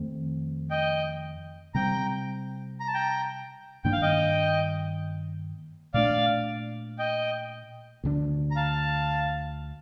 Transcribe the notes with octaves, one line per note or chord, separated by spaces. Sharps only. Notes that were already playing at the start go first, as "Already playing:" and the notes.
Already playing: F2 D#3 A3 C4
D#5 G5
C3 G3 C4 G5 A#5
A#5
A5
G5 A#5
G2 D#3 A#3 D4 G5
F5
D#5 G5
A#2 A3 D4 D5 F5
D#5 G5
D2 D3 G3 D4
A#5
F5 A5